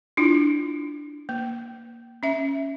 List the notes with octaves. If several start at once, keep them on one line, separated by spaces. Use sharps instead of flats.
D4 E4 F4
A#3
C#4 E5